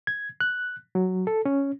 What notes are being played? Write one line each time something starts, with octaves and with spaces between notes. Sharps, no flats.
G#6
F#6
F#3
A4
C#4